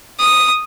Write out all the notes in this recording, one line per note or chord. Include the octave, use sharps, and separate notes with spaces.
D#6